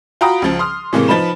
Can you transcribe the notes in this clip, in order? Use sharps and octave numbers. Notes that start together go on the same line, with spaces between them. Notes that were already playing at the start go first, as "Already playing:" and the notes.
F4 F#4 G5 A#5 B5 D#6
C#2 F3
C6 D#6 F6
A2 C3 E3 G#3 A#3
F3 D#4 B4 B5 E7